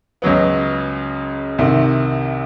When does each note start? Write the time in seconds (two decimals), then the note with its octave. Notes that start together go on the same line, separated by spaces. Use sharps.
0.22 C#2 C#3 F#3 B3
1.58 C2 C3 D#3